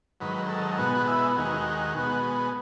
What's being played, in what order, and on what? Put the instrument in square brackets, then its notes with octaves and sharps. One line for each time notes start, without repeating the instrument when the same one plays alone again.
[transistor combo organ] G#2 D#3 F#3 B4
A4
B2 G#3 B3 F#4
F#4
E4
D#2 D#3 G#3 F#4
B2 G#3 B3